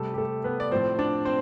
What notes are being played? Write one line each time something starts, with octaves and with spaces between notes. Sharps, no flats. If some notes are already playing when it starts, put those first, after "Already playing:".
Already playing: C3 G3 A3 A4
G4
A3 A4
B3 B4
D5
A2 F3 C4 C5
D4 D5
C4 C5